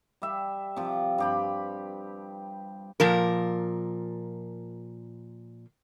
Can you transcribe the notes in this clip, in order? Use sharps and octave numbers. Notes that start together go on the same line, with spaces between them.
G3 E5
C3 F3
G2 G4 B5
A#2 F3 A#4